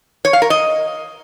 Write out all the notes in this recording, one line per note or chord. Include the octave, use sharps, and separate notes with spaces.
C#5
F5
A#4
D#5